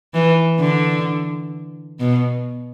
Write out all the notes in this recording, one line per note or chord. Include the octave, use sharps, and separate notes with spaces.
E3
D3
B2